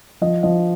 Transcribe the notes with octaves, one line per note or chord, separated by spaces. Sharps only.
F3 D#5
F3 D#5